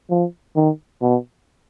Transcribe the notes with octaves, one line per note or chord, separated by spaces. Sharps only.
F3
D#3
B2